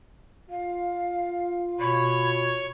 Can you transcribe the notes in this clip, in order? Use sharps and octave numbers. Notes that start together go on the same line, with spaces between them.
F4 F5
B2 C#5 B5